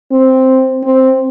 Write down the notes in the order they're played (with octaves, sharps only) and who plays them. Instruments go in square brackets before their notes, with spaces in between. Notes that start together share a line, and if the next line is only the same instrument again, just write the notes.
[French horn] C4
C4